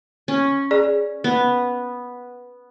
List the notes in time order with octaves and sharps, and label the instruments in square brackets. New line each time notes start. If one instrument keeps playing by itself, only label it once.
[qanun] C#4
[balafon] G#4 D5
[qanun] B3